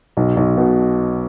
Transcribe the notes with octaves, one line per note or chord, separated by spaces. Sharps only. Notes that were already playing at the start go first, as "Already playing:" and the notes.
B1
B1
B2